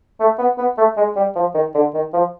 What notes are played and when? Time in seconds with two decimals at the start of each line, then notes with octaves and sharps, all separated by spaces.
0.20 A3
0.38 B3
0.58 B3
0.78 A3
0.97 G#3
1.16 G3
1.35 F3
1.54 D#3
1.74 D3
1.94 D#3
2.13 F3